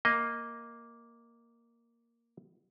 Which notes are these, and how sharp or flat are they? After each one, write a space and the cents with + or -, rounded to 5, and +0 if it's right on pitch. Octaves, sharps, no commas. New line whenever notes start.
A#3 +0 D#5 +0